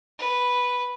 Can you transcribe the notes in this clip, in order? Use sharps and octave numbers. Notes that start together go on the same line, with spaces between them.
B4